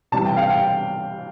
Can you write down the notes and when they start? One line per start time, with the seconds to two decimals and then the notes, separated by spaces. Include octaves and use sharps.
0.12 C3 E3 G3 A5
0.25 G5
0.37 F5
0.50 G5